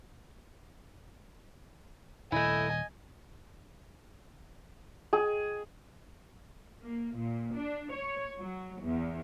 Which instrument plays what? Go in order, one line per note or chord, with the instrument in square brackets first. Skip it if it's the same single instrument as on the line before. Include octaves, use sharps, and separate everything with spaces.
[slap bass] D#1 [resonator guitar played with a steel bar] A3 E4 [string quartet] D#5 G#5
[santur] G#4
[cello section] A#3
A#2
D4
C#5
F#3
E2